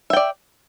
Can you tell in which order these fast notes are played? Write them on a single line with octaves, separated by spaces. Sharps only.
E5 G5 D5